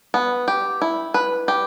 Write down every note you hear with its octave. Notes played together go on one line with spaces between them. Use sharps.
B3
G4
E4
B4
G4